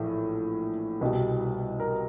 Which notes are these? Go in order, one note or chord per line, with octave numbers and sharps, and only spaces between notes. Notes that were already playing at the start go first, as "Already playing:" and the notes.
Already playing: A#1 A2 E3
C2 B2 G3
A#4